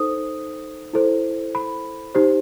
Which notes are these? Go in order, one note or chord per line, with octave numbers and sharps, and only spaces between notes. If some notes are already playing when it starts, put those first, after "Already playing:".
Already playing: D#4 A4 C5 D#6
E4 A4 C5
B5
D#4 G4 C5